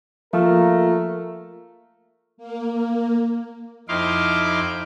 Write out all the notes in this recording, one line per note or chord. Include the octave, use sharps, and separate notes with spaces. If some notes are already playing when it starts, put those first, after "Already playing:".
F3 A3 A#3 F4 A#4
A#3
F2 D#4 E4 F5 C6 D6